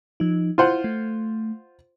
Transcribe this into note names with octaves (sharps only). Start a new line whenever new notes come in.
F3 D#4
E4 F4 C5 F#5
A3